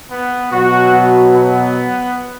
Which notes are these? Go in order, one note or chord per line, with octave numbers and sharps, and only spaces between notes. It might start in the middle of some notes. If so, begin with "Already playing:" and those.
B3
B2 F#3 F#4
B3
B3